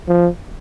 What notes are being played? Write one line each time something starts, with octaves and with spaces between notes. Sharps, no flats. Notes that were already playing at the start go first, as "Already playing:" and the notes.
F3